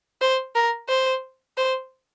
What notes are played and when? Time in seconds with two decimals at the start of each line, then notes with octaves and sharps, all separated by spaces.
0.21 C5
0.55 A#4
0.88 C5
1.57 C5